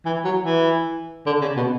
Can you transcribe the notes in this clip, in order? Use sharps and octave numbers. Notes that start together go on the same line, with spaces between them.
E3
F#3
E3
D3
C#3
B2